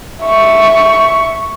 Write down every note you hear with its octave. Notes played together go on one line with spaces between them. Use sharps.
E5 C#6